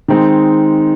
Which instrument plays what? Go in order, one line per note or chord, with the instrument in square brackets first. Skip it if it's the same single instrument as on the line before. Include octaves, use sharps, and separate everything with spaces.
[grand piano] D#3 G#3 C4 D#4